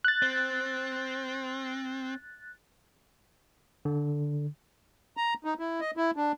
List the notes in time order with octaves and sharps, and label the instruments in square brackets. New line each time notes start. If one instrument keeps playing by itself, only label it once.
[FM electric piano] F#6 A6
[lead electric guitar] C4
[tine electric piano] D3
[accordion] A#5
D#4
E4
D#5
E4
D4